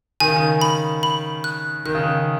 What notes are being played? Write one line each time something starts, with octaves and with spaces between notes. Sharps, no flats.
D#3 G#5
C#3
D#3
B5
B5
F#6
D#3 F#6
C#3
D#3